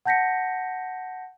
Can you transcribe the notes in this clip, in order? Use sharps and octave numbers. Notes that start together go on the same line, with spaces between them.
F#5 A5 G6 A#6 B6 C#7